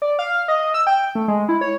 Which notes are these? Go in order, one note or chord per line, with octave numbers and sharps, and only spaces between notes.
D5
F5
D#5
E6
G5
A3
G#3
E4
C#5